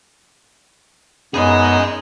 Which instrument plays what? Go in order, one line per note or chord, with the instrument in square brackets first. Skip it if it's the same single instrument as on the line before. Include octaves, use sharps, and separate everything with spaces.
[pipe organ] F#2 B3 D#4 [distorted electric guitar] G#4 D#5